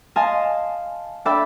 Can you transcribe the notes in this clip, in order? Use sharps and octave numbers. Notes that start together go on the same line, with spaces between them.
D#5 F5 G#5 A5 C6
D4 A4 D5 E5 G5 B5